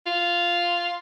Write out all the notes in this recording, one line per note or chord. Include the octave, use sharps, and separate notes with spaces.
F4